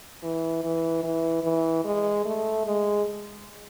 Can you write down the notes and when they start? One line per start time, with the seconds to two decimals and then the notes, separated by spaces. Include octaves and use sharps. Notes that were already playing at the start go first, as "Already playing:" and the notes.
0.23 E3
0.64 E3
1.03 E3
1.44 E3
1.85 G#3
2.25 A3
2.66 G#3